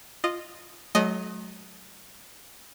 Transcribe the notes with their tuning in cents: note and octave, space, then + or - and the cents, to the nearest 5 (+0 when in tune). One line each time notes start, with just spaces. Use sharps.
F4 +0 D#5 -15
F#3 +0 A3 -40 D#5 +0